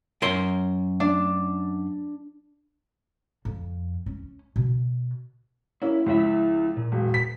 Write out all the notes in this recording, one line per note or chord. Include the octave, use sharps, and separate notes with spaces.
F#2 A#4 C6
D4
F2
C#4
B2
A#3 C#4 E4
C#2 F3 E4 E5
A#2
E1
B6